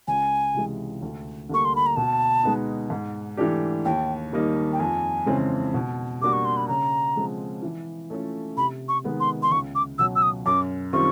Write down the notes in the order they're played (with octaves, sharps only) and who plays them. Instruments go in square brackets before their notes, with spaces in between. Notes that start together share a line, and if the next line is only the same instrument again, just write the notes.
[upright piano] C#2 [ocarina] G#5
[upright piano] C3 E3 G#3
D2
[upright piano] D3 G3 A#3 [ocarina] C#6
[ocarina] C6
B5
A#5
[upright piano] B2 [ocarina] A5
[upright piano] G#3 B3 D#4
G#2
E3 A3 D4 G4
[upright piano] D#2 [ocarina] G5
[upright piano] D#3 G3 A#3 D#4
[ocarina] G5
[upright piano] F2 [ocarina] G#5
[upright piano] C#3 E3 G#3 C4
B2
[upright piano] G3 A#3 D4 F#4 [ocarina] D6
[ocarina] C#6
C6
B5
[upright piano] C#3 [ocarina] A#5
[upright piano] F3 G#3 C4
E3
A3 C#4 F4 A4
[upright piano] C3 [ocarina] B5
[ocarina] C#6
[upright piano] D#3 G#3 B3
[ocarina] C6
C6
[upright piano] C#2 [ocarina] C#6
[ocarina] D6
[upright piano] B2 F#3 [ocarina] E6
[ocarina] E6
D#6
[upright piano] F#2 [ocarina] D6
[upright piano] D#3 G3 C4 F4 [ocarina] C#6